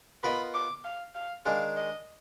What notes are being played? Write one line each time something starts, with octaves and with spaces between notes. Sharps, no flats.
B3 F4 A#4 D#5 B5
D6
F5
F5
D#3 G#3 D4 F5
D#5